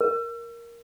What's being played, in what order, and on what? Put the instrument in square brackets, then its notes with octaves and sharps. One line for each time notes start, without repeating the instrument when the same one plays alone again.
[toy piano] A#4